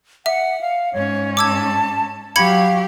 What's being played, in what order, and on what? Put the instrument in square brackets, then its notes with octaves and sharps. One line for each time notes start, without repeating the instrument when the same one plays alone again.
[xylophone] E5 [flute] F#5
[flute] F5
[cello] G#2 C#4 [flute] C#5
[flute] A5 [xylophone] D6 E6 G#6
[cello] F#3 G4 [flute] F5 [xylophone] B5 G#6 C#7